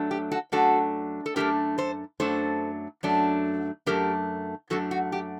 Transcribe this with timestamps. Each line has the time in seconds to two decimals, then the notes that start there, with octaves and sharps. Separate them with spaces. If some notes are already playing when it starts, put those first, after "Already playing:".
Already playing: F#2 F#3 A3 D4
0.11 G4
0.31 F#4 A4
0.52 F#2 F#3 A3 D4 F#4 A4
1.26 A4
1.36 F#2 F#3 A3 D4 G4 A#4
1.78 A4 C5
2.20 F#2 F#3 A3 D4 A4 C5
3.03 F#2 F#3 A3 D4
3.86 F#2 F#3 A3 D4 G4 A#4
4.70 F#2 F#3 A3 D4 F#4 A4
4.91 F#4
5.12 G4